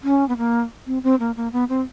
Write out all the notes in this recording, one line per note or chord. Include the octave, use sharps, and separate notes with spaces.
C#4
B3
A#3
C4
C4
A#3
A#3
B3
C4